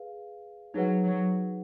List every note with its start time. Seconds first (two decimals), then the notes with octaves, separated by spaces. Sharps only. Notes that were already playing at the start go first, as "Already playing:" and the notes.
Already playing: G#4 B4 F5
0.74 F#3 D#4 G#4 B4 F#5
1.05 F#3